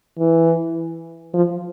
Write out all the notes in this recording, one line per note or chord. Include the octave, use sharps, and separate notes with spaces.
E3
F3